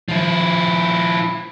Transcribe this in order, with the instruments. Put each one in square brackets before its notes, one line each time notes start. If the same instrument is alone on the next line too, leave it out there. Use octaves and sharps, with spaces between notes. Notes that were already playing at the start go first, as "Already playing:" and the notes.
[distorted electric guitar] F3 E4